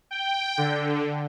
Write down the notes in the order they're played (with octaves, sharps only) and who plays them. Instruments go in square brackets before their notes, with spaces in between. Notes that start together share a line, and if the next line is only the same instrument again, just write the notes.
[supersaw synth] G5
D3